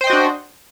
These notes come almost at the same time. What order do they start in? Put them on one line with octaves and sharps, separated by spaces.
C5 G5 D#5 F#4 D4